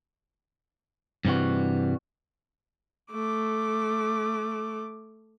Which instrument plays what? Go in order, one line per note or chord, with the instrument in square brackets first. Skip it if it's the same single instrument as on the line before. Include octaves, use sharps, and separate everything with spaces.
[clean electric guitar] G2 C3 E3 G3 F#4
[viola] A3 D6